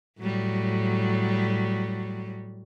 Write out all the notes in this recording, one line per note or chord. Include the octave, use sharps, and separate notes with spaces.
A2 F#3 G3